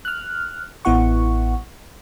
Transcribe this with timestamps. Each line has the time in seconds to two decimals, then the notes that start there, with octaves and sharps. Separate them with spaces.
0.05 F6 F#6
0.85 A1 B3 E4 F#5 C#6